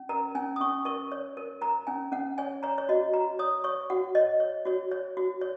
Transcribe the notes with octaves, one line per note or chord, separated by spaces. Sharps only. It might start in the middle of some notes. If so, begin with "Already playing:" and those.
Already playing: C#4
A#4 A#5
C#4 G#5
D#6
C#4 C#6
A#4 C#6
C#5
A#4
A#4 A#5
C#4 G#5
C#4 F#5
C#5 G#5
C#5 A#5
C#5
F#4 D#5
F#4 A#5
C#5 D#6
C#5 C#6
F#4 F#5
C#5 D#5
C#5
F#4 C#5
C#5
F#4
C#5